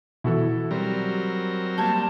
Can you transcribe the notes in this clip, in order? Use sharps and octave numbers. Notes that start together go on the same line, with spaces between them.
B2 E3 E4 F#4 A4
F#3 G3 C4 A#4
G3 A#3 A5 G6 G#6